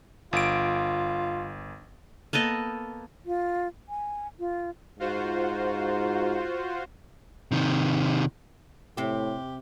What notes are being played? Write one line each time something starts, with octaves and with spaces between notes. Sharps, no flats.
G1 F4 D7
A#3 B3 A4 D#5
F4
G#5
F4
G#2 F4 F#4 C5
C3 D#3
A2 C3 G4 C5